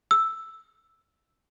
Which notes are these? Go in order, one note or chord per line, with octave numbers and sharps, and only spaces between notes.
E6